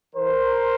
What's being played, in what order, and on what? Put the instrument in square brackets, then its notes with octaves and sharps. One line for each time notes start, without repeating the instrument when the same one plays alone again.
[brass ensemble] E3 A#4 C5